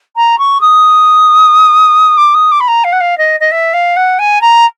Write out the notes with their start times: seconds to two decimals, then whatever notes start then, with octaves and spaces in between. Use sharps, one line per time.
0.16 A#5
0.38 C#6
0.61 D#6
2.17 D6
2.34 D#6
2.51 D6
2.60 B5
2.68 A#5
2.84 F5
2.92 F#5
3.00 F5
3.18 D#5
3.40 D#5
3.51 E5
3.73 F5
3.96 F#5
4.19 G#5
4.41 A#5